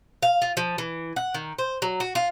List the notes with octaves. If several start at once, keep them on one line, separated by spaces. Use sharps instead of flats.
F5
F4
F3
E3
F#5
D#3
C5
F#3
F#4
F4